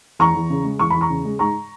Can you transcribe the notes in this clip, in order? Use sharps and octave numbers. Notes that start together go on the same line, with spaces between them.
E2 A#5 C#6
E2
C#3
G#3
E2 C#6
E2 B5
A#5 C#6
C#3
G#3
G#2 A#5 C#6